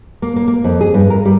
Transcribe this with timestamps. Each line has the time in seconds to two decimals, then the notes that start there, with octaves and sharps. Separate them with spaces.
0.22 A#3
0.36 A#3
0.48 A#3
0.64 F2
0.81 G#4
0.94 G2
1.10 A#4
1.25 G3